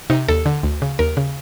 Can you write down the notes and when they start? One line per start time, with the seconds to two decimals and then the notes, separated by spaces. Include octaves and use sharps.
0.10 C3 D#4
0.29 D#2 A4
0.46 D3
0.63 D2
0.82 C#3
0.99 D#2 A#4
1.17 C#3